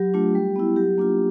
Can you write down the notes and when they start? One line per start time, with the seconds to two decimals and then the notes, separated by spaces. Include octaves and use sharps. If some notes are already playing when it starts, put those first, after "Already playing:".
Already playing: F#3 G4
0.14 A3 D4 F4
0.35 G3
0.56 B3 E4
0.76 F#3 G4
0.98 A#3 D4 F4